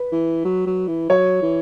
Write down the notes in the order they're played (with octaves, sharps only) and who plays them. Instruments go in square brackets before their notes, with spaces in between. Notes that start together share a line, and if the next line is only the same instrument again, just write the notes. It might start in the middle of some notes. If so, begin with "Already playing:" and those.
Already playing: [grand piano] B4
[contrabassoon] E3
F#3
F#3
E3
[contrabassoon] F#3 [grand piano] C#5
[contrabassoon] E3